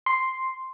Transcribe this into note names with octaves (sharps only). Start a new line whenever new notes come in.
C6